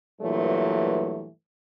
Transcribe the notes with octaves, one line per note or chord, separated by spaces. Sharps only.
G2 A#2 E3 F#3 A3